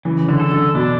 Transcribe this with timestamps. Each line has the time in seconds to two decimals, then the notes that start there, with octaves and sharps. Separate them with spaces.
0.05 C#3 E3
0.28 D3
0.40 A4
0.51 D3
0.75 B2 D4